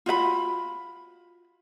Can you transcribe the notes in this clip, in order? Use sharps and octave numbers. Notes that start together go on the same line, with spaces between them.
F4 F#4 E5 B5